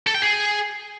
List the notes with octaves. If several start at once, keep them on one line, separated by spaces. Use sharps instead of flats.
A4
G5
G#4